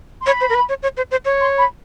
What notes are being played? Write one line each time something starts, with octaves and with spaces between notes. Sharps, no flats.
C6
C#5 B5
C5
A#4
B4
C#5
C#5
C5
C5
C#5
C6
B5